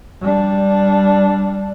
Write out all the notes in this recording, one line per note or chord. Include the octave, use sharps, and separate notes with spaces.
G3 D4